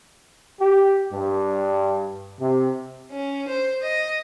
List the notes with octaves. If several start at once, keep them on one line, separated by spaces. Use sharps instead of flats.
G4
G2
C3
C#4
C5
D#5